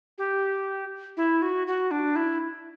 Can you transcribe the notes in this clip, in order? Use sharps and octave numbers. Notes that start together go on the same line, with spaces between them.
G4
E4
F#4
F#4
D4
E4